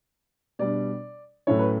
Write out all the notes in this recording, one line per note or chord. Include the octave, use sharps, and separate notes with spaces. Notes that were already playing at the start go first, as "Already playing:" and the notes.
B2 G3 D4 D5
A2 F#3 A3 C#4 E4 C#5
B4